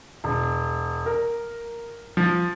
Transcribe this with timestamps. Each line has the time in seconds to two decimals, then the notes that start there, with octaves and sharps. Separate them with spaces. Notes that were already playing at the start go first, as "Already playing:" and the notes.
0.24 E1
1.06 A#4
2.17 F3